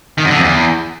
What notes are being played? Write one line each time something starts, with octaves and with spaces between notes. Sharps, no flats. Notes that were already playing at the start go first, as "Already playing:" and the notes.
D#3
F#2
D3
F2
E2